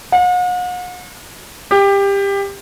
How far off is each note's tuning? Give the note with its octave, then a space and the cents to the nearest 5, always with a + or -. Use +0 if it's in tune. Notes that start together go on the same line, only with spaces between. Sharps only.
F#5 -45
G4 +20